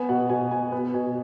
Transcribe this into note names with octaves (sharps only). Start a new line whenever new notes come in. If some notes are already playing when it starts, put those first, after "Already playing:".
Already playing: B3 G#5
B2 F#5
B2 G#5
B3 G#5
B3
B2 G#5